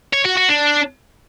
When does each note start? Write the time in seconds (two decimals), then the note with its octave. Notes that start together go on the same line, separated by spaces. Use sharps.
0.13 C#5
0.25 F#4
0.37 F#4
0.49 D4